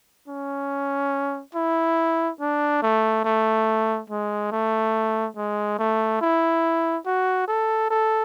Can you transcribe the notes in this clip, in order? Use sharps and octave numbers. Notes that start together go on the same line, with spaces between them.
C#4
E4
D4
A3
A3
G#3
A3
G#3
A3
E4
F#4
A4
A4